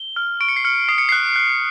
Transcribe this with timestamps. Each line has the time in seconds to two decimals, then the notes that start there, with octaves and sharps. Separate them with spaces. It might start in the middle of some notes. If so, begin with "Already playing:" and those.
Already playing: G7
0.16 F6
0.40 C#6 D7
0.49 C#7
0.56 C7
0.64 F6 C#7
0.88 D#6 C7
0.98 C#7
1.09 F#6 C7
1.36 F#6